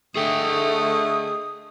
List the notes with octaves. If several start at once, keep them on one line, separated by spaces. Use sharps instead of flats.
D3 A3 G#4 D#5 G5 D#6